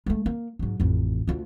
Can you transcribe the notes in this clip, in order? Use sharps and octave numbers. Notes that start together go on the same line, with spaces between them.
G#3 A3
A#3
G#2 F#3
A1 F2
D2 F4